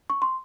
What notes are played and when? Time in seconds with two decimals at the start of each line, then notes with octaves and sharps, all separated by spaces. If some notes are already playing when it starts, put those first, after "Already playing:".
0.10 C#6
0.22 C6